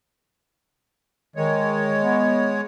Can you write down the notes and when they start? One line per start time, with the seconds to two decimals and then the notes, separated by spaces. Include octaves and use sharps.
1.36 D#3 G#3 C#5
2.03 B3